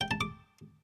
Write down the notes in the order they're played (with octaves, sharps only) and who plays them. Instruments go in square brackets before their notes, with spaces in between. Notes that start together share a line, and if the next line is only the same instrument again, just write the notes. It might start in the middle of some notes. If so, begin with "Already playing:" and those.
[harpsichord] G5
A5
D6